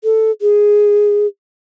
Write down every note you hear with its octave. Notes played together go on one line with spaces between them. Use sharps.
A4
G#4